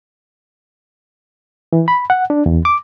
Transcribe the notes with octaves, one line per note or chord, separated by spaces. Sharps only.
E3
B5
F#5
D4
E2
D6